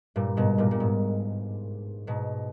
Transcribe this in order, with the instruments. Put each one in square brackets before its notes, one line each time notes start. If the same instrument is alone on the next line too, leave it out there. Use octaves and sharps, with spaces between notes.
[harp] G2 A#2
G#2 B2
G2 A#2
A#2
G#2
G#2 B2